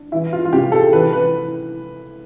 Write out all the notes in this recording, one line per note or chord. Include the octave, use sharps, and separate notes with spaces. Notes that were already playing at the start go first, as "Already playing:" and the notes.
Already playing: D4
E3 E4
F4
F4
C3 G4
A4
E3 B4
B4